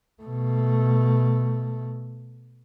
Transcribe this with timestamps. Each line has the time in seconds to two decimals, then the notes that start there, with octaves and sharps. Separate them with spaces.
0.23 B2 A3